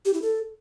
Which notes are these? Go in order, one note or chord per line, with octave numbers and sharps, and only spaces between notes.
G4
E4
A4